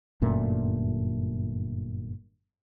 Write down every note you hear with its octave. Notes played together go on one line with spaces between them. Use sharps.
G1 F#2 A#2 A3